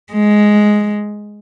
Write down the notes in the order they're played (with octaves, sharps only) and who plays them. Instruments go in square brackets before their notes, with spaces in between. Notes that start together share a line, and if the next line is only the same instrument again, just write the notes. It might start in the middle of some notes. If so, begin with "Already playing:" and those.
[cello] G#3